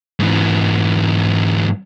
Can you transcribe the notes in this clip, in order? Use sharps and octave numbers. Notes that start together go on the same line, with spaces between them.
G#2 E3